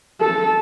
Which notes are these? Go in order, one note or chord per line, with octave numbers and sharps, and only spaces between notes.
A4